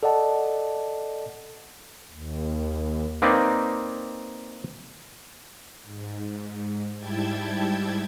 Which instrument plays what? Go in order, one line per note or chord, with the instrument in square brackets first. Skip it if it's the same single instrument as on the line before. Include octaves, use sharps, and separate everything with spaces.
[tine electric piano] A4 D5 D#5 F#5 A5
[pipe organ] D#2
[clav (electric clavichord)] A#3 C4 D#4 B4 D5
[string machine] G#2
G#2 G3 E4 G5 A5 G#6